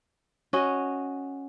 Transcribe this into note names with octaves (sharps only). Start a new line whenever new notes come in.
C#4 F#4 D#5